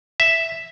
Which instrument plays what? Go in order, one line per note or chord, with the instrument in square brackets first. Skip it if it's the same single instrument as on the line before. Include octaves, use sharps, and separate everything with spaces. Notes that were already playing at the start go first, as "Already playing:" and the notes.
[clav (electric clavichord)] E5